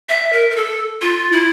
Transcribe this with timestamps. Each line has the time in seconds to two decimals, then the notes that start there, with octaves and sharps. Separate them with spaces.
0.09 E5
0.33 A#4
0.51 A#4
0.56 A4
1.02 F4
1.32 E4